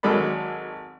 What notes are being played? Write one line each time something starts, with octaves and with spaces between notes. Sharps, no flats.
G#1 F#3 G#3 A4 D5 B5